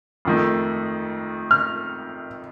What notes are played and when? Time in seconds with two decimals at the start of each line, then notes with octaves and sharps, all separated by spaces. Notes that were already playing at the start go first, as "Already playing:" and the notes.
0.25 F2 D#3 A3
1.51 F6